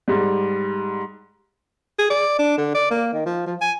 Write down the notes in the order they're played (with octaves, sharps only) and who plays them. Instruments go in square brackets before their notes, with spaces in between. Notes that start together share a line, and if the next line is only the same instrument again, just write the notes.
[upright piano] G#2 G3
[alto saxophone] G#4
D5
D4
D3
D5
A#3
D#3
F3
F3
G#5